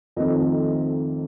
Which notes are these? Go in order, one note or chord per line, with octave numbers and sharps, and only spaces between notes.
F2 D#3 A3 C4 D#4 D#5